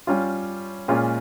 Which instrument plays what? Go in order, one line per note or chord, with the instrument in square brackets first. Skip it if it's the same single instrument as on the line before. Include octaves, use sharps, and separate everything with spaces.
[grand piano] G3 C#4 F4
A#2 G#3 C#4 F4